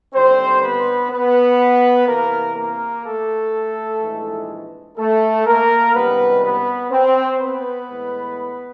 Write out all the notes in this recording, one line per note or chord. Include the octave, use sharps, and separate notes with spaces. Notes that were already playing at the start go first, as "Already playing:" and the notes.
D#2 D3 G3 C4 C5
B3 B4
B3 B4
E2 C3 E3 A#3 A#4
A#3 A#4
A3 A4
A#1 G#2 E3 G#3
A3 A4
A#3 A#4
C#2 C3 D#3 G3 B3 B4
B3 B4
C4 C5
B3 B4
A2 E3 G#3